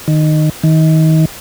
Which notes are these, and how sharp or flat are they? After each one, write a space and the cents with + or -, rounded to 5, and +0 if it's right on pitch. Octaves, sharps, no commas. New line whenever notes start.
D#3 -15
D#3 +30